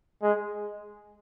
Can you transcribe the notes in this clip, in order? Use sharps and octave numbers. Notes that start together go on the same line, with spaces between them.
G#3